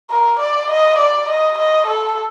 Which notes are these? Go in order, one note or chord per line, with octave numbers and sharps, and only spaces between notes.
A#4
D5
D#5
D5
D#5
D#5
A4